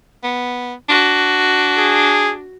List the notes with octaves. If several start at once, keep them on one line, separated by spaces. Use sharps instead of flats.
B3
D4 F#4
G#4